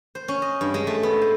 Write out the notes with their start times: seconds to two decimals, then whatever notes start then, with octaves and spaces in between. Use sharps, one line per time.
0.15 C5
0.28 C#4
0.42 D#5
0.61 G2
0.74 G#3
0.87 A3
1.03 B3
1.21 C5